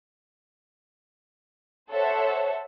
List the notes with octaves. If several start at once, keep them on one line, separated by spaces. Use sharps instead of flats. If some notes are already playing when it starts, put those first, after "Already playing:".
A4 C5 C#5 E5 F#5